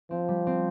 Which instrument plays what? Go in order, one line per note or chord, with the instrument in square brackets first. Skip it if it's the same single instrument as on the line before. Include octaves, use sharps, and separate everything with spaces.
[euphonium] F3 [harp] C4
[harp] G3
C4